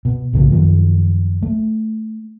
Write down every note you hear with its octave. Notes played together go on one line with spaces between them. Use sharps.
B2
B1 A2 C#3 A3
F#2 D#3 F3
A3